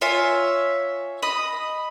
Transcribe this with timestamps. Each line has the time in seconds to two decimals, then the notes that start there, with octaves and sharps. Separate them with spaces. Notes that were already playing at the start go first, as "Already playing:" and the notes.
0.01 F4 C#5 E5 G#5
1.22 D#5 B5 D#6